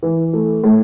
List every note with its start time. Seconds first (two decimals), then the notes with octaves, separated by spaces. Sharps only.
0.03 E3
0.33 A3
0.64 A2